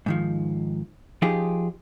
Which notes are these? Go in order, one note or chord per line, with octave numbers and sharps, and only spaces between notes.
G#2 D#3 F3
F3 D#4 F4 G4 G#4